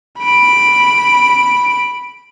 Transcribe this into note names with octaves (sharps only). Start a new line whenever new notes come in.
B5 D7